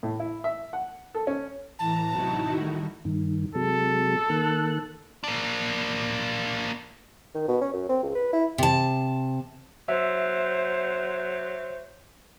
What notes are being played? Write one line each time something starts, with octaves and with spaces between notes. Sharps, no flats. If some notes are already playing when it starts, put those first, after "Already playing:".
A2
E4
E5
F#5
A4
C#4
A2 E3 A5 A#5
A1 C3 F#3 D#4 E4 F#4
D#3 G3 A3
G2 D#3
C3 F#3 G#3 A4
D#3 A#3 F#6
A#3 D4
D#3
B2
C#4
F#2
C4
C#2
B4
E4
C3 A5
F#3 C5 E5